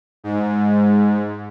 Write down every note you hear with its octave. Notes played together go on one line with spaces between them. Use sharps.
G#2